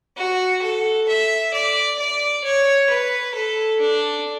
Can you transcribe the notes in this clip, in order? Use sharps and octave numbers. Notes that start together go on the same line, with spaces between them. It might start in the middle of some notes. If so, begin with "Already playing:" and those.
F#4
A4
E5
D5
D5
C#5
B4
A4
D4